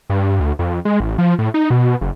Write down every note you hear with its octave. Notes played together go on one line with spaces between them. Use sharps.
G2
D2
F2
G#3
A1
F3
A2
D#4
B2
F#1